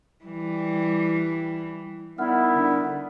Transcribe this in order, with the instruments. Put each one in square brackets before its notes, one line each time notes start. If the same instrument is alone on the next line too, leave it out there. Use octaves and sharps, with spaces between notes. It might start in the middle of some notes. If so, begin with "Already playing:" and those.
[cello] E3 G3
[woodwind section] D#3 G3 B3 [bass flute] D#4 [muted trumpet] E4 [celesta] F#5 F6
[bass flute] D3